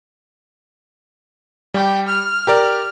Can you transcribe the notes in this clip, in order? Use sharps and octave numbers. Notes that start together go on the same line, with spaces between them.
G3 G4
F6
G4 A#4 D5